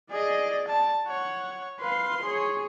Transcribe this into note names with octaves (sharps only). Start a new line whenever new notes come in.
G#4 D5 D#5
A5
C#5 F#5
B4 F5 C6
G#4 C#5